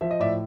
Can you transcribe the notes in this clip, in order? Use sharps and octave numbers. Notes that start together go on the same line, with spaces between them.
F3 E5
D#5
A2 D5 E5